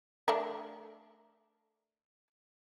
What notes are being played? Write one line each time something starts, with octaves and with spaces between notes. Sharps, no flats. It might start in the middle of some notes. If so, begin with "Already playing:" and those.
A3 D4 A#4